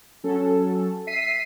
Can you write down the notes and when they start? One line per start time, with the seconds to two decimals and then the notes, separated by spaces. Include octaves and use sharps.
0.24 F#3 C#4 A4
1.07 E5 B6 C7 D#7